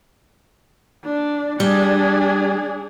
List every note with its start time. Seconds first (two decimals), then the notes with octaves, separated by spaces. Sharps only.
1.04 D4
1.60 G3 D4 G#4